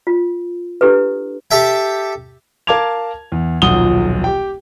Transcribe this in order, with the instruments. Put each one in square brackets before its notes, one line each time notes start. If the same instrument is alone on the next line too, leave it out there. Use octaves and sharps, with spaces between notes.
[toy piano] F4
D4 E4 G4 A4 B4
[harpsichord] G4 A4 E5 G5
[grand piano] A#4 F5 A5 D6 G#6 F7
E2
D#1 B1 F3 F#5 D#6 G7
G4 G5